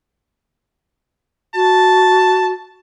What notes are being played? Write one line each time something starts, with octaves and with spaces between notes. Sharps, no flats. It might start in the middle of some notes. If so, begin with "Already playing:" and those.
F#4 A5